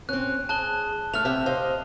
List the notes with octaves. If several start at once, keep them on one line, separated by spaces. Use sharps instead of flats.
C4 C#4 F#6
G#4 A5 F#6 G7
A3 F6 F7
C3 E5 G5
C5 D#5 F5